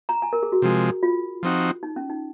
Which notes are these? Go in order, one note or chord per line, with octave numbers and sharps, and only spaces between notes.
A#5
G#5
A#4
G#4
F#4
C3 F3 G#3
F4
F3 C4 D#4 F#4
D#4
C#4
D#4